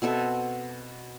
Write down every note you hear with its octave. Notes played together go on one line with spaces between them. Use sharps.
B2 C4 A4 E5